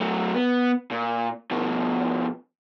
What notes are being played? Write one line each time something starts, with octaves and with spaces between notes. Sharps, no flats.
F#3 A3
B3
A#2
B2 F3